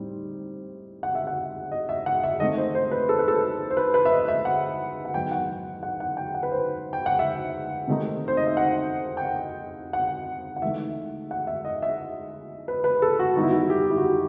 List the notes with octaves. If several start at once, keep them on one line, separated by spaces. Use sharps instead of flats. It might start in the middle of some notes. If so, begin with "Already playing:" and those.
Already playing: A2 G3 C4 D#4
F#5
E5
F#5
D#5
E5
F#5
E5
D#3 A3 C4 D#4 D#5
C5
C5
B4
A4
B4
A4
C5
B4
B4
E5
D#5
E5
F#5
F#5
D#3 F#3 B3 G5
F#5
F#5
F#5
G5
F#5
B4
C5
G5
F#5
E5
C3 D#3 A3 C4 D#4
C5
D#5
E5
F#5
G5
F#5
F#5
F#5
E3 A3 D#4 E5
F#5
E5
D#5
E5
B4
B4
A4
F#4
D#3 G3 B3 D#4 F#4
E4
F#4
G4
E4
F#4
G4